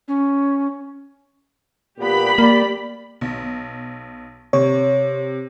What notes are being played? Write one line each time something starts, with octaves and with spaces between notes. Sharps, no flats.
C#4
A#2 B3 G4 B5
A#3 D5
B1
C3 C#5